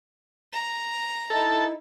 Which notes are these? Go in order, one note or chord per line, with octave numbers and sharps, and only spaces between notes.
A#5
D#4 E4 A4